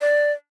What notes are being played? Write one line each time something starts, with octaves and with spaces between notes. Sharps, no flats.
D5